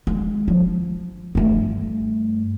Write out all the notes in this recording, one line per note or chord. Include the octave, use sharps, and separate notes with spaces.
G#3
F3
G2 A3